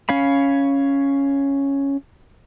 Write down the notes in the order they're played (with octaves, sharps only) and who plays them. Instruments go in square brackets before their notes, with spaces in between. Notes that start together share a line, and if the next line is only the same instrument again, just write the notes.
[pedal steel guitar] C#4 C#5 F5 B5